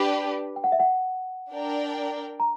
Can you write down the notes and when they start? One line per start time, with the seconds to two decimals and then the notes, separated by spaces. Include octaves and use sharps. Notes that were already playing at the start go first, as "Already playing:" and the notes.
Already playing: D4 G4 B4
0.56 G5
0.64 F#5
0.72 E5
0.80 F#5
1.51 D4 A#4 D5 G5
2.40 A#5